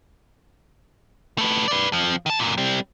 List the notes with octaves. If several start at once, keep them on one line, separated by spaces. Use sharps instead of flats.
A3 B4
B4 D5
F2 F3
D#3 A5
F#2 A#2
G3 C4